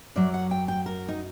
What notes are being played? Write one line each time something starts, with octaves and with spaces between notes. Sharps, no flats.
F#2 F#3 D5
F#5
G5
G5
A#4
D#4